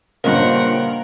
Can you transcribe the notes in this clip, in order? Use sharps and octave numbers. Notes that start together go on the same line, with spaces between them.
G2 A#2 C#3 A#3 C4 A#4 F5 F#5